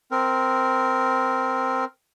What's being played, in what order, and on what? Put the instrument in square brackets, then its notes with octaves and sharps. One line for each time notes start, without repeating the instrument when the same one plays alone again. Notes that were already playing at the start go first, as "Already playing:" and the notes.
[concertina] C4 A#4